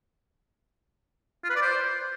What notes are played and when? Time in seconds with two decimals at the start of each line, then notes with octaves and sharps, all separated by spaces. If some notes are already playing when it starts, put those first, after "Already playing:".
1.44 F4
1.50 B4
1.56 D5
1.62 C5